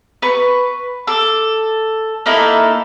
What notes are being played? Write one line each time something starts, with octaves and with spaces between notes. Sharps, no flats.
B4 C#6
A4 D6
A#3 D#4 E4 A4